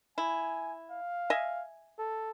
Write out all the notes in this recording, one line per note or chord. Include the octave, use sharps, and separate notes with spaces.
E4 G#5
F5
D#5 E5 G#5
A4